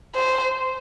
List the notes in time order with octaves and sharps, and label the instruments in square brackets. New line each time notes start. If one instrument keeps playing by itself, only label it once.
[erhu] C5